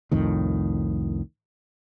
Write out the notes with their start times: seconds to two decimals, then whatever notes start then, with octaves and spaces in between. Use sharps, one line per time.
0.11 C2 F2 A2 D#3